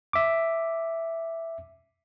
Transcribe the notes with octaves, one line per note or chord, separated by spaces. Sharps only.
E5 D6